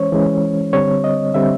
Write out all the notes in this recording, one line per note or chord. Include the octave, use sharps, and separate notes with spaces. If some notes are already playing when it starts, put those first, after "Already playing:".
Already playing: E3 G#3 C#4 C5 C#5
E3 G#3 C#4
D3 G3 C4 C#5
D#5
D3 G3 C4 E5